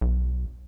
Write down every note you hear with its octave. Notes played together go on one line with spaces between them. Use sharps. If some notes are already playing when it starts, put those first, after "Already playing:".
B1